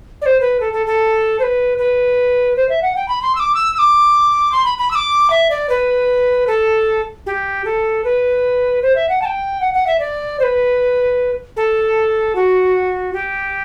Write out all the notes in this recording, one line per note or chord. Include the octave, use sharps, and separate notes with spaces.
D5
C5
B4
A4
A4
A4
C5
B4
B4
C5
E5
F#5
G5
B5
C6
E6
D6
E6
E6
D6
C6
B5
B5
E6
D6
E5
D5
B4
A4
G4
A4
B4
C5
E5
F#5
A5
G5
F#5
F#5
E5
D5
C5
B4
A4
F#4
G4